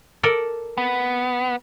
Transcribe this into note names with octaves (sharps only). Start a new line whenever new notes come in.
A4 A#4 D5
B3